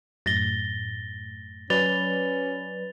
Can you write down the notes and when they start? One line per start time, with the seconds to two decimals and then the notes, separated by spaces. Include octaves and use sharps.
0.26 F#2 A2 A6 A#6 G7
1.70 F#3 C#4 B4 D5 A6 F7 G7